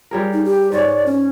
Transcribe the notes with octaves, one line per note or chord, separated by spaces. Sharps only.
G3 G#4 A#4
D#4
G4
G#2 C#5 D5
C#4